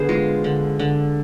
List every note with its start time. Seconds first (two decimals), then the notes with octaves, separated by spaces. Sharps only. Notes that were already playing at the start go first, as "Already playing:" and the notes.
Already playing: D3 B3 G#4 C5
0.09 G#3 F4
0.44 D3
0.79 D3